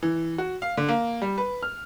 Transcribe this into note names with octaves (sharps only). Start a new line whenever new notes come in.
E3
F#4
F5
D3
A#3
G3
B4
F6